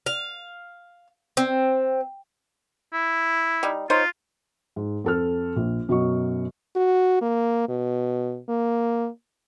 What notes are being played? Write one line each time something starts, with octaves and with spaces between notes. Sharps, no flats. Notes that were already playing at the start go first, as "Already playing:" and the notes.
F5
C4
E4
G3 D#4
D#4 F4 C5 C#5
G#2
F2 A4 F6
A#1
F#2 B2 F#3 D#5 C#6
F#4
A#3
B2
A#3